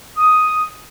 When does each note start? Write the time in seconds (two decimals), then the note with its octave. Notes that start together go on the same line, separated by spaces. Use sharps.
0.17 D#6